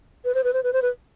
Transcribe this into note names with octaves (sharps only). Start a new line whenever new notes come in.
B4
C5
B4
C5
B4
C5
B4